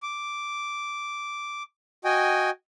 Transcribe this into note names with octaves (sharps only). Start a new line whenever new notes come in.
D6
F#4 D#5 G5 G#5